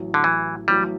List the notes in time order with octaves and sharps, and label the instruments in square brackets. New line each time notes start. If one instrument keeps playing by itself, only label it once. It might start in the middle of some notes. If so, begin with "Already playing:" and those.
Already playing: [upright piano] A1 A2 F#3
[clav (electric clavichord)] D3
E3
[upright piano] A1 A2 F#3 [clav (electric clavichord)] G3